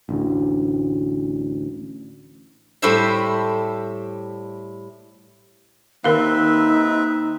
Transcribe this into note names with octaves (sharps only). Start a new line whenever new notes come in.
A1 D2
A2 G3 A3 C5 E5 B5
D#2 D#3 C4 D#4 A#4 B4 E5 F5